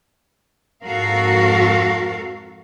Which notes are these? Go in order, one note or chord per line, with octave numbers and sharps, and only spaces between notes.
F2 G#2 F#4 A4 A#4 F5